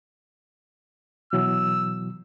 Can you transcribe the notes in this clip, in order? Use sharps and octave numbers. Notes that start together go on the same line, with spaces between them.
B2 E3 F#3 E6